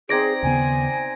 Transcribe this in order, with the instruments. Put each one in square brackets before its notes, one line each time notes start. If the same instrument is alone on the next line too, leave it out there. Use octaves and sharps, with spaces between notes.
[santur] C4 D#4 D5 [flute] G#4 [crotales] G#6 A#6 D7
[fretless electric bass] D#2 C#3 B3 [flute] G#5